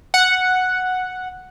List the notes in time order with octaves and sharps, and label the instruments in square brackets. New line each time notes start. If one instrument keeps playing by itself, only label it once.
[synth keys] F#5